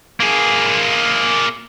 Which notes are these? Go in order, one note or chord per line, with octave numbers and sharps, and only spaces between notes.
A#3 G#4